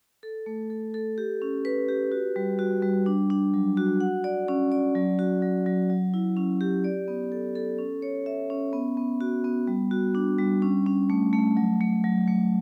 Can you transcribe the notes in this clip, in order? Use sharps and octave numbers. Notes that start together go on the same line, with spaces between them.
A4
A3
A4
A4
G4
C#4
B4
G4
F#4
G3
F#4
G3
D4
D4
F#3
F#4
F#5
D5
C#4
D5
F#3
F#4
F#3
F#3
F#3
E4
C#4
G4
D5
B3
A4
A4
C#4
C#5
E5
C#4
B3
B3
F#4
B3
G3
F#4
D4
G3
C#4
C#4
A3
A3
F#3
A3
F#3
A3